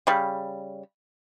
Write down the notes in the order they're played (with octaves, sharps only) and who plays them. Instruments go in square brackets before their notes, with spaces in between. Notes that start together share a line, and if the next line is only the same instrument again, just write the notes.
[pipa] C#3 G3